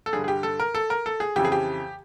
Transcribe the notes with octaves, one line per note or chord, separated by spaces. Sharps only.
A4
G2 D3 G3 G#4
G#4
G4
A4
A#4
A4
A#4
A4
G#4
F2 C#3 E3 G4
G#4
G4